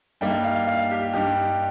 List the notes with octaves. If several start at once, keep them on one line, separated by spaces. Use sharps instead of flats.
G2 G3 A#3 D#4 G5
F5
F5
G4
G2 G3 D#4 G4